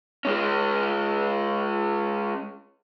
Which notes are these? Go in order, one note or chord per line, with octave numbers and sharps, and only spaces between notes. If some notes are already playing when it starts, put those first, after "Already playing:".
G#3 C#4